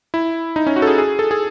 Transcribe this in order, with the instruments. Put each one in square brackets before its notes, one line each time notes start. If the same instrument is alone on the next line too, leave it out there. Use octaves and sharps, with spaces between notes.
[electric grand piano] E4
D#4
C#4
F#4
A4
G#4
G#4
A4
G#4